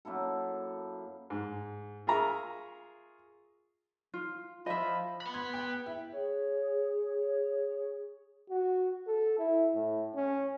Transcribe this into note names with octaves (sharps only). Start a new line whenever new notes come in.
F#2 A#3 E4 A4
G#2
F4 G#4 A#4 E5 A#5 C#6
F4
F3 D#5 E5 B5
B3 B5
C6 F#6 G#6
G5
E4
G#4 C#5
F#4
A4
E4
A2
C#4